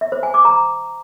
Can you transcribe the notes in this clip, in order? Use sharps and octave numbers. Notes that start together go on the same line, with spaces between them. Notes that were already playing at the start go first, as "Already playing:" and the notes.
E5
C5
G#5
D6
A#5